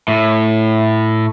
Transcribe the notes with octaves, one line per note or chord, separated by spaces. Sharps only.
A2